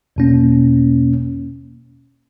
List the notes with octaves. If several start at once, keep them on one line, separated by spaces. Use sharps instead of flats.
E2 B2 A#3 C#4